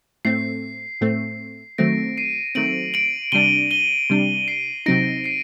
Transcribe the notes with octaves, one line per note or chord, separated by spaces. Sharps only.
A2 A3 C4 C7
A2 A3 C4
D#3 F#3 A3 C4 A#6 D7
C7 D#7
D#3 F#3 A3 C4 D7 F#7
D7 F#7
C3 G3 D4 D#7 G7
D#7 G7
C3 G3 D4
C7 D#7
C3 F#3 C4 D#4 A#6 D7
C7 D#7